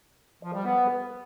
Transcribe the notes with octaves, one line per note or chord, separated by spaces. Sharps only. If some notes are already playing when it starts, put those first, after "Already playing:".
F3
G3
B3